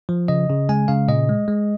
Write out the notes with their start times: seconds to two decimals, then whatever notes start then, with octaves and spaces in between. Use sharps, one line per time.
0.09 F3
0.28 C#3 D#5
0.49 C#3
0.69 G#3 G#5
0.88 C#3 F5
1.08 A#2 D#5
1.29 G#3
1.48 G#3